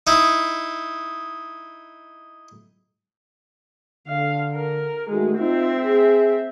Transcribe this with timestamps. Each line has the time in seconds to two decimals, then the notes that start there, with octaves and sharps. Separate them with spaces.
0.07 D#4 E4
4.07 D3 F5
4.55 A#4
5.09 D#3 G#3 A3 F#4
5.38 C4 D#4 F4 E5
5.81 G#4